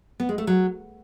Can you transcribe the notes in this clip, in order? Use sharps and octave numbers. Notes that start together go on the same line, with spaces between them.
B3
G#3
A3
F#3